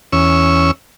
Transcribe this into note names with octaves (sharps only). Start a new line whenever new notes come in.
E2 C#4 C#6 E6